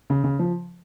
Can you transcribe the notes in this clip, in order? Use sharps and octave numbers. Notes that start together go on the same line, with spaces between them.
C#3
C#3
F3